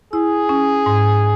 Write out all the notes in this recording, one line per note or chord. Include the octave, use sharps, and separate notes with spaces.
E4 G#4
C#4
G#2